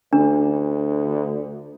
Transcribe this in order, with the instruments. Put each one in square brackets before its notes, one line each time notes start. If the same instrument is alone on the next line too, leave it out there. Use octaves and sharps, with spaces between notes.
[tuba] D2 [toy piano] D4